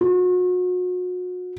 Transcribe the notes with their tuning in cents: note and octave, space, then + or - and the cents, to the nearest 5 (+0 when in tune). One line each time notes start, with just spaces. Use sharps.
F#4 -35